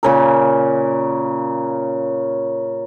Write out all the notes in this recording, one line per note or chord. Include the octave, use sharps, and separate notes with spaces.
A#2 C#3 A#4